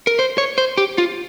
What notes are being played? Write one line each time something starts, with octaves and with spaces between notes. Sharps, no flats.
A#4
C5
C#5
C5
G4
F4